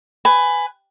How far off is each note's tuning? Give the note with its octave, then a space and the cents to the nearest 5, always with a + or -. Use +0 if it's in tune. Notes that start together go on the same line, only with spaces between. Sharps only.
B4 +15 G#5 +0